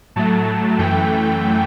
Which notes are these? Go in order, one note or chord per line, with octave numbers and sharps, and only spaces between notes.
A2 F#3 A3 A5
F#2 E3 A3 G5